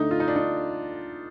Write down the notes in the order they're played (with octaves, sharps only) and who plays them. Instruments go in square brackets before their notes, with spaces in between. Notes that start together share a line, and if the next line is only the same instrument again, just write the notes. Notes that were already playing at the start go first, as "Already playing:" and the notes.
Already playing: [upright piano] D2 D3 A3 D4 [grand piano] D#4
[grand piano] F4
D#4
D4
D#4